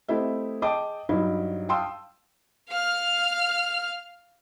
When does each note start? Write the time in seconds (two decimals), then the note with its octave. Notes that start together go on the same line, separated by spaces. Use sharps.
0.08 A3 C4 E4 G4 D#5 E5
0.62 G#4 D#5 G5 A5 D6
1.09 G2 F#3 G3 D#4 E4
1.69 F5 G5 A5 C6 D#6 E6
2.70 F5 F6